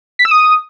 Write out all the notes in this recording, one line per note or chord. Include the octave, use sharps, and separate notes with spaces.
B6
E6
D#6